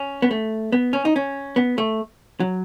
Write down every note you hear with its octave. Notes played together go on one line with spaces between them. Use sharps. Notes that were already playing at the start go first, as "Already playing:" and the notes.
Already playing: C#4
B3
A3
B3
C#4
D#4
C#4
B3
A3
F#3